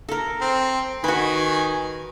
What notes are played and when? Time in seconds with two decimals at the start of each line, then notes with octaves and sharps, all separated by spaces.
0.09 A4 A#4
0.41 C4
1.04 D#3 F#4 B4 G#5